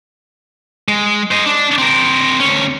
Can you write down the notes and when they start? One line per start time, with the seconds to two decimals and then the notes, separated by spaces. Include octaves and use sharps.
0.88 G#3
1.31 C5 D#5
1.46 D4
1.78 C4 A#4
2.40 D2 C#4